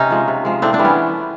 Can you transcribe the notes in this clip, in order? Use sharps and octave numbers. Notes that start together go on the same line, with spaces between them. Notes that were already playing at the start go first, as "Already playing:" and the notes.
Already playing: C3 C#4 D#4
F3 G#3
C3
F3 G#3
A2 C4 D4
C4 D4
E3 G3
B3 C#4